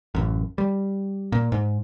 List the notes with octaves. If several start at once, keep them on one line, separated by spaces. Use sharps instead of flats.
A1 F#2
G3
A#2
G#2